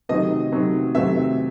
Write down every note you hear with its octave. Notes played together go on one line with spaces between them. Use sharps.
C3 D#3 F#3 A3 C4 D#5
C3 D#3 F#3 A3 C4
C3 D#3 F#3 A3 C4 E5